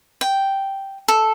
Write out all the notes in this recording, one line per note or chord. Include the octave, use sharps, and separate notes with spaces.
G5
A4